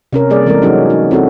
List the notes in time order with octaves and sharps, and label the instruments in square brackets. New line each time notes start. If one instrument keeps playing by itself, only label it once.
[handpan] C3 C#4 A#4
G3 A#3 G#4 D5
E3 G#3 C4 A4 A#4
F#3 C#4 D#4 F#4
D#4
C4 E4 F#4 A4